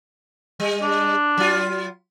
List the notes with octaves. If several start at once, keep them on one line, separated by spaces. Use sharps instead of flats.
G3
D4
F#3 F4